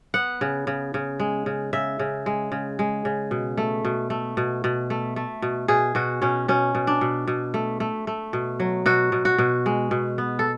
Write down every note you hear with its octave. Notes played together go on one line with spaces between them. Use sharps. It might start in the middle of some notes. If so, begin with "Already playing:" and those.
B3 F#5
C#3
C#3
C#3
G#3
C#3
C#3 E5
C#3
G#3
C#3
G#3
C#3
B2
A3
B2
A3
B2
B2
A3
A3
B2
B2 G#4
B2 F#4
B2 C#4
B2 C#4
B2
D4
B2
B2
A3
A3
A3
B2
F#3
B2 F#4
B2
F#4
B2
G#3
B2
B3
A4